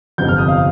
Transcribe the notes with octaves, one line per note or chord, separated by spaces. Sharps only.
G1 F2 C3 G6
F6
D#6
F5